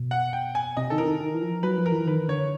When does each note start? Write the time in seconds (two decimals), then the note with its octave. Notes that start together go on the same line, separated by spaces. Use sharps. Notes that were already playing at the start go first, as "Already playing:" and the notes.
Already playing: B2
0.11 F#5
0.33 G5
0.55 G#5
0.77 C3 D#5
0.90 D#3 A4
0.98 E3 A#4
1.06 D#3
1.20 D#3
1.35 E3
1.42 F3
1.63 F#3 B4
1.78 F3
1.86 A#4
1.92 E3
2.06 D#3 B4
2.28 D3 C#5